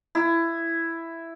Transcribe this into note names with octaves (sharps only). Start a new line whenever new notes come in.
E4